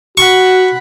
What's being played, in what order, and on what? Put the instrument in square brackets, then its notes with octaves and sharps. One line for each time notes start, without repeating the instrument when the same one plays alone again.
[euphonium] F#4 [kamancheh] F#5 B5 [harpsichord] C#6